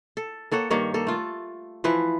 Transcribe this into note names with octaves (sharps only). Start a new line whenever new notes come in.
A4
A#3 A4 C#5 F#5
G2 D#3 A#3 C#5
A#3 A4
A3 F4
E3 F3 E4 B4